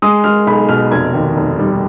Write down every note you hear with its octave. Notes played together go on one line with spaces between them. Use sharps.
G#3 D#6
G#3 F6
B1 B5
B2 F6
F1 G#6
D#2
F1
G3